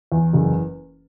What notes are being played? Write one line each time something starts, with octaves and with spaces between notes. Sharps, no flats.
E2
F#1